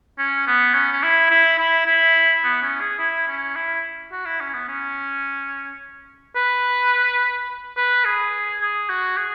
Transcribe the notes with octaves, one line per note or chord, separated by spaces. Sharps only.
C#4
B3
C#4
C#4
E4
E4
E4
E4
B3
C#4
G#4
E4
C#4
E4
F#4
E4
C#4
B3
C#4
B4
B4
G#4
G#4
F#4
G#4